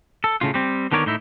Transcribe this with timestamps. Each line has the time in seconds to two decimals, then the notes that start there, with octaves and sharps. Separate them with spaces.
0.24 A4
0.41 A2 C#3 F4
0.54 G3 C4
0.92 D3 D#3 B3 A#4 C#5 D5
1.06 A2 D#4 E4